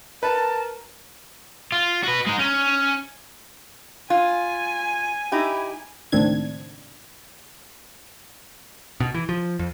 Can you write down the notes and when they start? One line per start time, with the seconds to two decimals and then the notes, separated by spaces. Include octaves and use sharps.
0.23 A#4 B4 A5
1.72 F4
2.04 F#4 B4
2.27 G#3 D#4
2.39 C#4
4.10 F4 G#5
5.32 D#4 E4 G4
6.12 C#2 A2 D#3 C4 D4 G#6
9.00 B2
9.14 E3
9.29 F3
9.59 F2